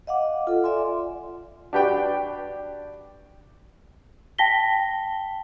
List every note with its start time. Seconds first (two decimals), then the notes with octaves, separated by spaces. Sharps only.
0.07 D#5 F5 F#5 D6
0.47 F4 A4
0.64 D5 E5 G#5 C6
1.73 D4 F#4 G4 B4 D5 G5
4.38 G5 A5 A#6 B6 G7